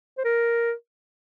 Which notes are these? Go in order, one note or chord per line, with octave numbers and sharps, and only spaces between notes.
C5
A#4